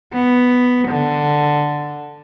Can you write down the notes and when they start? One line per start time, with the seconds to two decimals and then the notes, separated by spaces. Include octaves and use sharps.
0.13 B3
0.88 D3